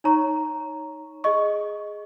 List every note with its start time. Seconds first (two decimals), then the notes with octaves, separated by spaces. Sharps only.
0.04 D#4 C#5 A#5 C#6
1.24 G#4 D#5 C#6